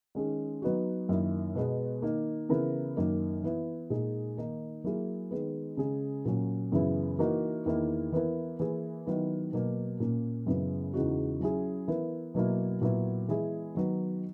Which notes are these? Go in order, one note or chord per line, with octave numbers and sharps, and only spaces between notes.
D#3 G#3 C#4 G#4
F#3 B3 D#4 F#4
F#2 D#3 A#3 E4
B2 G#3 B3
D#3 A#3 D#4
C#3 E3 B3 E4 A#4
F#2 D#3 A#3 D#4
E3 B3 E4
A#2 G#3 D#4 G#4
D#3 A#3 D#4
F#3 A#3 E4 G#4
D#3 G#3 B3
C#3 G#3 C#4 G#4
A#2 F#3 C#4
F#2 C#3 E3 B3 E4
E3 A#3 D#4 F#4 A#4
E2 D#3 A#3 E4
E3 B3 E4 A#4
E3 A#3 E4 G#4
D#3 F#3 B3 E4
B2 F#3 A#3
A#2 A#3 C#4
F#2 C#3 G#3 B3 E4
E2 C#3 G#3 D#4 F#4
F#3 C#4 E4 G#4
E3 B3 E4 A#4
B2 F#3 A#3 E4
A#2 F#3 B3 E4
E3 G#3 B3 E4 G#4
D#3 F#3 B3